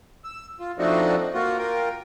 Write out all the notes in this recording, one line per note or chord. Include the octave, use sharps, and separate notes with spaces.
E6
F4
F3 A3 C4 D4 D#4 F#4
A#3 F4 F#4
F4 A#4 G5